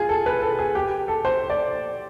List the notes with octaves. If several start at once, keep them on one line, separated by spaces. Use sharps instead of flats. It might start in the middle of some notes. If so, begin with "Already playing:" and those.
Already playing: F4 G#4
A4
B4
A4
G#4
G4
A4
C5
D5